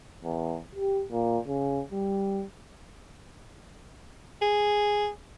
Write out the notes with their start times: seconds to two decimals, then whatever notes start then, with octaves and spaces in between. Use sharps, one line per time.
0.24 E2
0.75 G4
1.11 A#2
1.47 C#3
1.92 G3
4.42 G#4